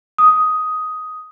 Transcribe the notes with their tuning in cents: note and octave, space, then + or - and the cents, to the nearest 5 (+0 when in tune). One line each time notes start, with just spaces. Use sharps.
D#6 +10